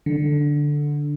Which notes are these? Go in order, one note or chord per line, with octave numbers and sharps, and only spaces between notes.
D3